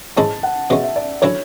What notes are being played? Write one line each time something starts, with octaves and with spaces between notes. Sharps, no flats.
G#2 G#3 C#4 E4 A5
F#5
B2 G#3 C#4 E5
E5
D5
D3 F#3 C#4 E4 C#5